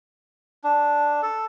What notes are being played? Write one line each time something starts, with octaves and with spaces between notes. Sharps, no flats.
D4
A4